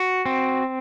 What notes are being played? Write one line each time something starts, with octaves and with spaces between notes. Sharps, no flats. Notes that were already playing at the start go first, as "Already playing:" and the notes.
Already playing: F#4
C4